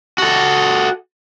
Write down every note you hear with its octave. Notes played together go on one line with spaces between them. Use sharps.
F#4 A4